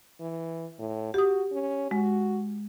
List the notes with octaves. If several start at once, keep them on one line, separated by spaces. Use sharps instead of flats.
E3
A2
F#4 G4 D#6
C#4
G#3 F#4